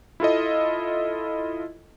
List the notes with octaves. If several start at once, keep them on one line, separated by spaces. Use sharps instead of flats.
E4 F4 A4 D#5